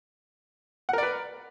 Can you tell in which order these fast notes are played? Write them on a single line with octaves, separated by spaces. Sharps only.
F#5 A#4 D5 B4